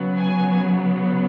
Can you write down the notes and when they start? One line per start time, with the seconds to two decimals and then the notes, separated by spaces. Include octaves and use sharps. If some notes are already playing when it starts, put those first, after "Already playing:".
Already playing: C#3 F#3 B3
0.18 G#5